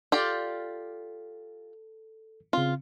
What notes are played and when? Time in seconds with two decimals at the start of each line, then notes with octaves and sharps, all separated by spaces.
0.12 F4 G4 A4 D5
2.53 C#3 C4 F4